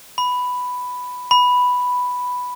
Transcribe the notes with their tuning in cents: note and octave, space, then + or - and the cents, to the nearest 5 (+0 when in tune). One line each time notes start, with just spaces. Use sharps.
B5 +5
B5 +0